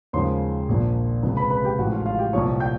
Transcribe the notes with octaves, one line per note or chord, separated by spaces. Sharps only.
D#2 C#3 F3 G#3 C5 C6
A#1 A#2 F3
C#2 C3 F3 G#3
B4 B5
B4 B5
G4 G5
A1 A2 F3 G#3 F#4 F#5
F4 F5
F4 F5
G4 G5
C2 A#2 F3 C#5 C#6
G5 G6